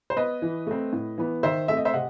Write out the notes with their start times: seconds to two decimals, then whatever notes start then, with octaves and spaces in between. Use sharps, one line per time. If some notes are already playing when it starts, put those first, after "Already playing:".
0.10 C5
0.16 B3 B4 D#5
0.42 E3
0.67 A3 C4
0.93 A2
1.18 E3 B3
1.43 D#3 C5 E5
1.68 A3 C4 E5
1.77 D#5
1.85 C5 E5
1.94 C3 D#5 F#5